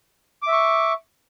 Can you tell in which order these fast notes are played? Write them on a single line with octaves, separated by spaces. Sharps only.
D6 E5 C#6